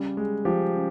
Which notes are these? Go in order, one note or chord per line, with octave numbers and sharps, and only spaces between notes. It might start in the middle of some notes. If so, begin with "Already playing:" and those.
Already playing: C#3 G3
G#3
F3 G4
C#3